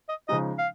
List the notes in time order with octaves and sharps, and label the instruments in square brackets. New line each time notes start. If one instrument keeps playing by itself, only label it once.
[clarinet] D#5
[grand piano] C#3 F3 G#3 D#4 [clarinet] D#5
[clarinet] F5